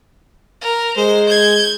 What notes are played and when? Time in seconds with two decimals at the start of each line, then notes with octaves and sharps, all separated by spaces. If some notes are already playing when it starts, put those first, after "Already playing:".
0.62 A#4
0.97 G#3 C5
1.29 G6 G#6